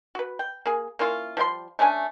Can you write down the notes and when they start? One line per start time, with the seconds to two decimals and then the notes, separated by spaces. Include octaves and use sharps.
0.15 F#4 B4
0.39 G5
0.66 A#3 G#4
0.99 A#3 C#4 E4 F4
1.37 F3 G3 E4 C6
1.79 A3 C#4 D4 G#5